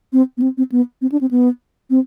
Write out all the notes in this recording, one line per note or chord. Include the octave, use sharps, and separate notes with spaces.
C4
B3
C4
C4
B3
C4
D4
C4
B3
C4